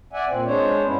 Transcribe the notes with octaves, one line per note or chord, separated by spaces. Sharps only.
D5 E5 F#5 G#5
A#2 C4
G#3 D4 C5 C#5
G2 B3 C#4 E4